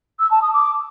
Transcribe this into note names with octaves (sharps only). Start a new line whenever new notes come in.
E6
A5
D#6
D6